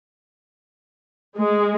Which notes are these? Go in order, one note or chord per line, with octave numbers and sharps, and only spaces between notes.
G#3